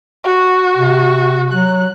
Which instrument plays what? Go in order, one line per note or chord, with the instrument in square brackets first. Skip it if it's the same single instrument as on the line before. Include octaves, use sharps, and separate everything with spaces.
[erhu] F#4
[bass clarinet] C3
[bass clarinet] F#3 [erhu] F#6